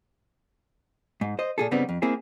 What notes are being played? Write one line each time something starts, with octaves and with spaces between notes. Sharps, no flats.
G#2
C5 D#5
A#2 G#4 A4
G2 C#3 G3 B3 C4 D#4
F2
A#3 C4 E4 G#4